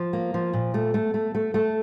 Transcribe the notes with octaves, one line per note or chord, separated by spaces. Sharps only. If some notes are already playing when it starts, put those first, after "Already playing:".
Already playing: F3
A#3
F3
A#2
A3
A3
A3
A3
A3